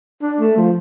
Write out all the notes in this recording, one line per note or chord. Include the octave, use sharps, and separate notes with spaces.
D4
A3
F3